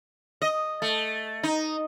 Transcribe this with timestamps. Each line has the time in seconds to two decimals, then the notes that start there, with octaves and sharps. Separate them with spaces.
0.42 D#5
0.82 A3
1.43 D#4